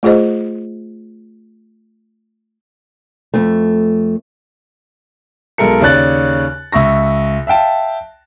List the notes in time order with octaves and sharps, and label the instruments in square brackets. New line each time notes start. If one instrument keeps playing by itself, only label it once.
[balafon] A3 F4 G#4 C5 D#5
[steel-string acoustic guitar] F2 G#2 A3
[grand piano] B1 G#3 A4 A#4 C#7
D#2 C#3 C#5 D5 F#6 A6
C#2 E5 C#6 A#6
E5 F5 G5 A5